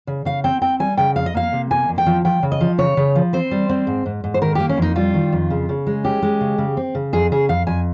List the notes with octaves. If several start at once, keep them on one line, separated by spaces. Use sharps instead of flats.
C#3
C#3 F5
C4 G5
C4 G5
G3 G#5
C#3 G5
F2 F5
D#5
A#3 F5
C3
A#3 G#5
F2
G5
F3
F3 G5
C#3
D#5
F3
C#3 C#5
C#3
F3
C4 C5
G3
C4
G#2
G#2
G#2
C5
D#3 A#4
G4
A#3
C#4
F2 D#4
G3 F4
D#3
F2
C#3
C#3
G#3
C#4 G4
G#3
C#3
C#3
C4
C#3
F2 G#4
C#3 G#4
F2 F5
F2 G#5